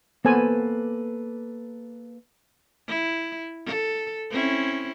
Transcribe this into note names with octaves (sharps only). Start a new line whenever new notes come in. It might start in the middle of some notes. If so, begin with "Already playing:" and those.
A#3 B3 A4 B4 C5 G#5
E4
A4
C4 C#4 E4